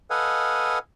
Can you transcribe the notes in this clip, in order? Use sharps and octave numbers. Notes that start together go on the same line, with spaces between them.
A4 B4 D#5 F5 F#5 G#5